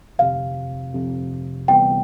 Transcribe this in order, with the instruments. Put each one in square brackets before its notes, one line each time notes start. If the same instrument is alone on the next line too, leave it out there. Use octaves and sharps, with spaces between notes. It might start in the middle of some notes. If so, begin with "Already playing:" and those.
[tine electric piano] G1 F2 C3 [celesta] F5
[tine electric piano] G1 F2 C3
[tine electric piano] D2 C3 E3 G3 B3 [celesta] G5